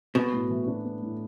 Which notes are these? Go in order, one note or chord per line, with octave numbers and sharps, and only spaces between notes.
B2 B3
A2
E3
D4
B3
A2